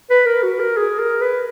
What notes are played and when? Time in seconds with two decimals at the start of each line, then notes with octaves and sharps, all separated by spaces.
0.10 B4
0.26 A#4
0.43 F#4
0.60 A#4
0.77 G#4
0.99 A#4
1.21 B4